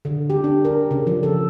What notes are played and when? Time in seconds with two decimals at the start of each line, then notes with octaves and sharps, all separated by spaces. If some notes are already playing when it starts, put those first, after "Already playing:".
0.05 D3
0.30 G4
0.44 D4
0.65 A#4
0.91 C#3
1.07 F3
1.23 A4